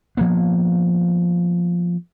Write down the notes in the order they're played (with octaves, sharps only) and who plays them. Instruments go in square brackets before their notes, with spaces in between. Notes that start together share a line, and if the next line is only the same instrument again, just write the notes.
[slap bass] F3 A#3 B3